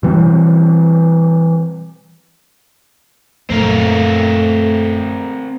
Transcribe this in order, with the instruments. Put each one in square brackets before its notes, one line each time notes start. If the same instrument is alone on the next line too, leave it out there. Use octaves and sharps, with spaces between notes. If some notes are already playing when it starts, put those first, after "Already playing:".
[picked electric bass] B2 E3 G3 C4
[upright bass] F#2 A#2 [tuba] A3 [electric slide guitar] C4 A#4 F5